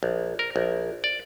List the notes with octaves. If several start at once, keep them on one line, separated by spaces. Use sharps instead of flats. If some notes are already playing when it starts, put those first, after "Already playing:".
A#1
A#4
A#1
D5